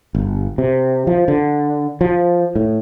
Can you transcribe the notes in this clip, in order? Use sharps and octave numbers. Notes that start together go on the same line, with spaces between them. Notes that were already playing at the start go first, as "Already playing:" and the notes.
G1
C3
F3
D3
F3
A2